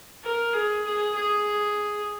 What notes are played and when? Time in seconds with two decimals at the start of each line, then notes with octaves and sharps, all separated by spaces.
0.24 A#4
0.53 G#4
0.85 G#4
1.15 G#4